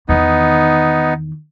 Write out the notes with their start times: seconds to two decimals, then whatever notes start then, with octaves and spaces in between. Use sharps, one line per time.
0.09 E2 D#3 B3 D#4